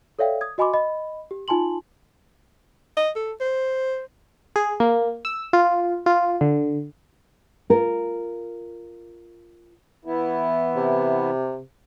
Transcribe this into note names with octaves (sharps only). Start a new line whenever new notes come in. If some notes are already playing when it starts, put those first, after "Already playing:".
A4 C#5 D5 E5 F5 G5
D#6 G#6
F#4 D#5 G#5 B5 C6 D6
D#5 B5
G4
D#4 F4 G#5 A5 C6 F#7
D#5
A4
C5
G#4
A#3
E6
F4
F4
D3
F4 A#4
E3 B3 E4
C3